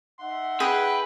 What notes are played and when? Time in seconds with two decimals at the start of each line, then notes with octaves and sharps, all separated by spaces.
0.19 D#4 E5 F#5 C6
0.60 G#4 B4 G5